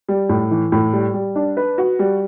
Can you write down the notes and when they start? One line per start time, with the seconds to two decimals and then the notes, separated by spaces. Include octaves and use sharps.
0.09 G3
0.29 A2
0.51 E3
0.72 A2
0.93 G3
1.14 G3
1.36 D4
1.57 B4
1.78 F#4
1.99 G3